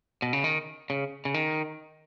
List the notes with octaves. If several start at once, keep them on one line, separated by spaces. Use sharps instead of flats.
B2
C#3
D#3
C#3
C#3
D#3